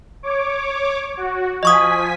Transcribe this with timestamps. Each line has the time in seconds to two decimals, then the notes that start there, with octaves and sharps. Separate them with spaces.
0.23 C#5 D6
1.17 F#4
1.63 F3 D#5 G#5 C#6 D#6 B6